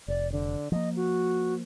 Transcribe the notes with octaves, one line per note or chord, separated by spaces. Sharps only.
F1 D5
D3
F3 A#3 D#5
F#4